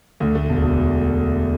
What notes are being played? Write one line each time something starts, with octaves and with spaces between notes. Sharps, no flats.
D2
A3
E1
E1